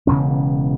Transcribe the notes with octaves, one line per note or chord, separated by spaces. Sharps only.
E1 E2 C#3 C#4